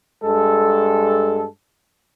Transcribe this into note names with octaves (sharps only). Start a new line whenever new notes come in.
G2 G#3 A4